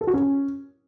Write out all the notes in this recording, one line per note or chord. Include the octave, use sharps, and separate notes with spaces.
A4
F#4
C#4